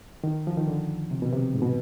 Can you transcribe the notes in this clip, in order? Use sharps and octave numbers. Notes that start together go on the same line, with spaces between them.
D#3
F3
D#3
D3
C3
B2
C3
G#2
B2